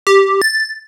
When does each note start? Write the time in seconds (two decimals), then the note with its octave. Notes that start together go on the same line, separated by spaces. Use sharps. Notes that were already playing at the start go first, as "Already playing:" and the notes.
0.07 G4
0.42 A6